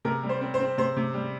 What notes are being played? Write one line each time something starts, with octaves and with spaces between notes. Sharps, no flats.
C3 A#4
G3
C5
C4
C5
C4
C3 C5
C3
G3